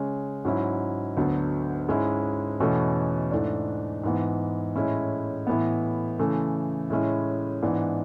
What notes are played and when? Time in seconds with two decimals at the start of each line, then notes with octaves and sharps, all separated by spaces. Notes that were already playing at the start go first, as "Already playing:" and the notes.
Already playing: C#3 G#3 C#4
0.45 G#2 F#3 C#4 E4
1.17 D2 D3 F#3 B3
1.89 G#2 G#3 C#4 E4
2.60 E2 B2 A3 C#4 E4
3.31 G#2 E3 A3 D4
4.03 G#2 E3 B3
4.76 A2 G#3 C#4 E4
5.47 A2 E3 B3
6.19 C#3 E3 A3
6.90 A2 G#3 C#4 E4
7.62 G#2 E3 B3 D4